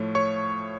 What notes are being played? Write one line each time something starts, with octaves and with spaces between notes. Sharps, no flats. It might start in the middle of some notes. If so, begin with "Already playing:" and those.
Already playing: A2 F3 A3 C#5
C#5 C#6